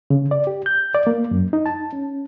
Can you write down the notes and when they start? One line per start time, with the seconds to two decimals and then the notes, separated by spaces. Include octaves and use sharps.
0.10 C#3
0.31 D5
0.47 G4
0.66 G6
0.95 D5
1.07 A#3
1.31 F#2
1.53 D#4
1.66 A5
1.93 C#4